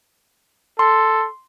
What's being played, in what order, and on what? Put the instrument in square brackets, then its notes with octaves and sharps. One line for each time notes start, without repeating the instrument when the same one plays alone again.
[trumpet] A4 [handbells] C6